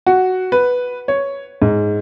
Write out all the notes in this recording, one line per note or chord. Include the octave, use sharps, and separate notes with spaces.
F#4
B4
C#5
G#2